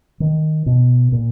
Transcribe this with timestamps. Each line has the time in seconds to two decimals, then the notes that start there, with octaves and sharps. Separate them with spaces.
0.20 D#3
0.66 B2
1.12 A#2